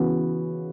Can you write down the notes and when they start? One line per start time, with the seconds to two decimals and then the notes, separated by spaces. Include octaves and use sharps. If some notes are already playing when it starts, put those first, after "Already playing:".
Already playing: C#3 E3 B3 F#4